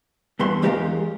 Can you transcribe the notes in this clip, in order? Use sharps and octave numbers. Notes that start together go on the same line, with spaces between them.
E2 G2 B3 C6
E2 G#3 G4 A4 A#4 F5